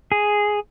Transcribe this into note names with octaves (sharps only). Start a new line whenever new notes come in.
G#4